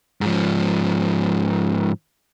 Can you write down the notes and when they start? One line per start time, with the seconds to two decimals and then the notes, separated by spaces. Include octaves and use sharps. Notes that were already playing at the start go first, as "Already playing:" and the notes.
0.21 G#2 F3